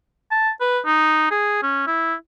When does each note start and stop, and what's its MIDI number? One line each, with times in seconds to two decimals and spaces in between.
0.31 0.50 81
0.61 0.80 71
0.86 1.30 63
1.31 1.60 68
1.63 1.86 61
1.87 2.14 64